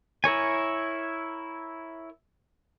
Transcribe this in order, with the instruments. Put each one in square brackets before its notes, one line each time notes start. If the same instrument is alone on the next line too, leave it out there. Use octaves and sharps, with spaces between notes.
[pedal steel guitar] E4 A#4 C#5 G#5